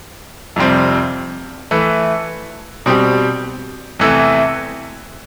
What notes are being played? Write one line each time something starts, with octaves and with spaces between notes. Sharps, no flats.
F2 C3 G3 C4
E3 A3 E4 B4
B2 G3 C4 G4
E2 C3 E3 A3 E4